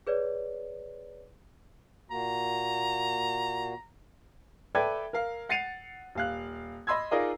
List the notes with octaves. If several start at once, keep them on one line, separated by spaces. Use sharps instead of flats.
G#4 B4 C#5 D5
A#2 A#3 F#4 A#5
A4 B4 D5 E5 G5 G#6
A#4 F5
F#5 A6 C7 C#7 D#7 F7
D#1 F5 F#6
D#5 B5 C6 E6 G#6
D#4 F4 G#4 A#4 D5 D#5